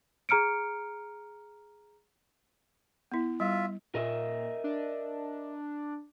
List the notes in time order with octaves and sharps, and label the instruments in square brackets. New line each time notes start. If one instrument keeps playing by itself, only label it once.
[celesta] G#4 A#5 F6 C#7 D7
[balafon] B3 E4
[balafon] G3 [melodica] F4 E5
[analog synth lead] A#2 [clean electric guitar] A#4 D#5 E5
[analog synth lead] D4